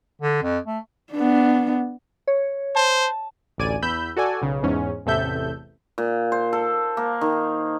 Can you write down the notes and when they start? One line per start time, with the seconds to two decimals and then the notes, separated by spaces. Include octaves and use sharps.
0.22 D3
0.42 F2
0.67 A3
1.13 B3 D4
2.27 C#5
2.75 C5 A5
3.58 A1 D2 D5 G#5 D#7
3.82 E2 B5 E6 G6
4.16 F#4 A4 D5 G#5
4.42 B1 C#3
4.63 E2 G#2 C#4
5.06 A1 E2 C3 A4 E5 G6
5.98 A#2
6.32 C5
6.53 A4
6.97 A#3
7.21 D#3